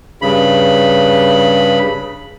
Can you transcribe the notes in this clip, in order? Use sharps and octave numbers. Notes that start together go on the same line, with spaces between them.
G2 C#3 B5